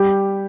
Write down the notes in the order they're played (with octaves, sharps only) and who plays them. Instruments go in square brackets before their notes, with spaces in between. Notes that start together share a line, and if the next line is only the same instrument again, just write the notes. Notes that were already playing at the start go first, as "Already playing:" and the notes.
Already playing: [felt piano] G3 G4